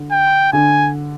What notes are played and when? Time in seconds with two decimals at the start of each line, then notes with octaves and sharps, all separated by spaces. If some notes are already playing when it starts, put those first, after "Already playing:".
Already playing: D3
0.12 G5
0.53 D3 G#5